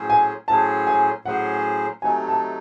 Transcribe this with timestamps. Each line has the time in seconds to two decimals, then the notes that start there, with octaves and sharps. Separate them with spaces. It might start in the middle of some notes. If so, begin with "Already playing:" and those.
Already playing: A2 F#3 C#4 G#4 C5
0.10 G#5
0.48 A2 F#3 C#4 G#4 C5 A5
0.87 G#5
1.25 A2 F#3 C#4 G#4 C5 F#5
2.02 C3 F#3 A3 D#4 G#5
2.29 A5